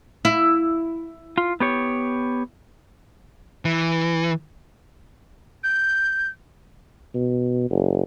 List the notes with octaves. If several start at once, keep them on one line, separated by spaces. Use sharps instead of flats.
E4
F4
B3 G4 C#5
E3
G6
B2
F#1